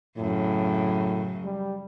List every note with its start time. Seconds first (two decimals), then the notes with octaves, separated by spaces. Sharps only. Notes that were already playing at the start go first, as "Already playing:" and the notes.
0.18 F#2 A2 C#3
1.44 G3